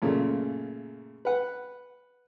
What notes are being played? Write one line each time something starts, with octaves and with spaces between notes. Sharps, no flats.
F#2 A#2 C#3 A3
B4 F#5